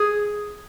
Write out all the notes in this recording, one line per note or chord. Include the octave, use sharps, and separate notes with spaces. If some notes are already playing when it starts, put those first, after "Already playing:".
Already playing: G#4